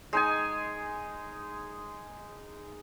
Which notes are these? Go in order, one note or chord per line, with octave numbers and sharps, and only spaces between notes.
G#3 D#4 G#5